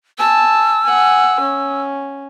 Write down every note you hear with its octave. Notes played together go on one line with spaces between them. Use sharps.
G#5 A5 E6
F#5 G#5
C#4